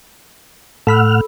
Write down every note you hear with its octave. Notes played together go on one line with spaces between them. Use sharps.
A2 A4 F#5 B5 E6 F6